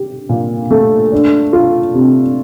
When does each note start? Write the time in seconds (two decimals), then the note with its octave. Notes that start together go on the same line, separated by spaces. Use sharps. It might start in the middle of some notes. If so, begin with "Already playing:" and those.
Already playing: G4
0.29 A#2
0.71 A3
1.12 D4
1.53 F4
1.94 C3